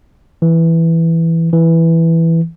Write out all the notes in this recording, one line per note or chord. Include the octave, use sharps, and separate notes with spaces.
E3
E3